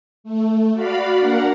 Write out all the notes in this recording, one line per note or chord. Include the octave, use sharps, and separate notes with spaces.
A3
F#4 D5 F5 B5
A#3 D4 A#4 F#5